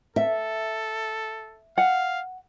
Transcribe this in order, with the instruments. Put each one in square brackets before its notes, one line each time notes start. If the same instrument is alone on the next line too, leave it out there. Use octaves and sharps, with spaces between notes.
[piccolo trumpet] A4 [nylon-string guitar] E5
[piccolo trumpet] F5 [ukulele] F#5